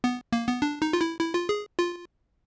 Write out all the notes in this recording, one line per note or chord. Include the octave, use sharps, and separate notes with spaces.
B3
A#3
B3
D4
D#4
F4
E4
E4
F4
G#4
F4